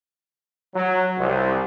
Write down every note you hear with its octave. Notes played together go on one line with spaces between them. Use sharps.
F#3
C2